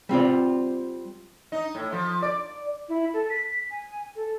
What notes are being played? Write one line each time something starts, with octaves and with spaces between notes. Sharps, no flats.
G3 C4 F4 D5
D#4
A2
F3
D5
E4
A4
B6
G#5
A4